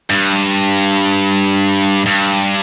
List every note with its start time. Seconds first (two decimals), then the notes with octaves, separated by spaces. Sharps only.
0.10 G2
2.06 G2